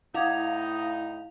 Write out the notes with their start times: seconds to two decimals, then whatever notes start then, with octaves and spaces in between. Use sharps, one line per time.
0.14 A2 D#4 E4 F5 F#5 D6 G#6 F7